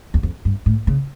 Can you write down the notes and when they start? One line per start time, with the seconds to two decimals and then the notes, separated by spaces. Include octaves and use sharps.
0.14 E2
0.23 F2
0.45 G2
0.66 A2
0.87 C#3